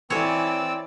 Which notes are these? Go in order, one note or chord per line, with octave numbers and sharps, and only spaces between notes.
E3 C4 C#5 D5 G#5 E6